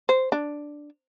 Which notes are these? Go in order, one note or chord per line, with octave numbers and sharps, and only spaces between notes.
C5
D4